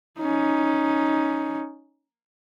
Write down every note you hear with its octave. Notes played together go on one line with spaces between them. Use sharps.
C#4 D#4